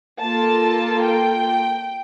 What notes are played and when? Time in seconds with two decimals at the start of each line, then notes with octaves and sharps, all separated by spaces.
0.20 A#3 F4 A4 A5
1.03 G5